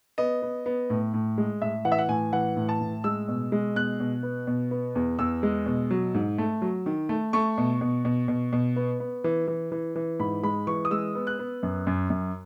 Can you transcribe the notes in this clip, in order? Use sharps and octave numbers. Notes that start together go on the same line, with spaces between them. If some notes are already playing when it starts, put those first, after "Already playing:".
B3 D#5
B3
B3
A2
A2
G#3
A2 E5
E3 F#5
E5
F#5
A2 G#5
E3 F#5
A2
A5
A2
G#3 E6
B2
G#3
B2 F#6
B2
B3
B2
B3
E2
E2 E6
G#3
B2
F#3
G#2
A3
F#3
D#3
A3
A3 C#6
B2
B2
B2
B2
B2
B3
B3
E3
E3
E3
E3
G#2 B5
G#3 B5
E3 C#6
D#6
G#3 E6
B3
F#6
B3
F#2
F#2
F#2